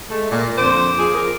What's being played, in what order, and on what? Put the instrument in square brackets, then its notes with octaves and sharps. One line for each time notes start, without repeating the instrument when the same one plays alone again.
[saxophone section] G#3 A3
A#2
[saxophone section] F2 D3 C5 [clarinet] D6
[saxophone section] F3 G#4
A#4